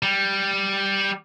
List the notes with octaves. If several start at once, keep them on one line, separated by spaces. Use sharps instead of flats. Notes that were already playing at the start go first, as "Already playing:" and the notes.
G3